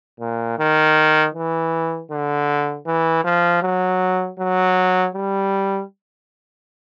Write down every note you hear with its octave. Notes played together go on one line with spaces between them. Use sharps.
A#2
D#3
E3
D3
E3
F3
F#3
F#3
G3